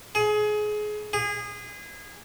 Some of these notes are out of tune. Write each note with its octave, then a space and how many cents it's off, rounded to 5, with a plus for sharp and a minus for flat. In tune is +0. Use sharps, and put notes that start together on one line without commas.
G#4 +25
G#4 -25